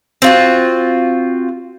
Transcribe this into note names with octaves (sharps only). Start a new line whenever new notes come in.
C4 F4 F#4